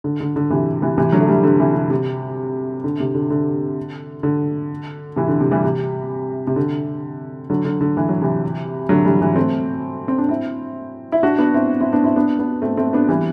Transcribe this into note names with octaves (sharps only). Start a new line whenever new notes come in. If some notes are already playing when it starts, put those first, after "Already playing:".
D3
D3
D3
C3 E3
C3 E3
C3 E3
D3 F#3
A3
E3 G3
D3
C3 E3
C3
C3
D3
C3
D3
D3
D3
C3 E3
D3
C3
E3 G3
C3
C3
D3
D3 F#3
D3
D3
E3
F#3
C3 E3
D3 F#3
E3 G3
E3 G3
A3 C4
C4
D4
C4 E4
E4
D4 F#4
B3 D4
C4 E4
C4 E4
B3 D4
C4 E4
B3 D4
B3 D4
A3 C4
A3 C4
B3 D4
E3 G3